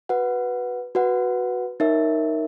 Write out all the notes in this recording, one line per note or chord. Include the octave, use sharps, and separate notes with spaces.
F#4 B4 F#5
F#4 B4 F#5
D#4 A#4 C#5 E5